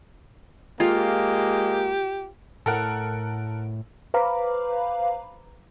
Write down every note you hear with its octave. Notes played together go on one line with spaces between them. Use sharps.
G#3 A#3 F4 G4
A2 A4 A#4 F#5
B4 C5 F5 A#5 B5 D6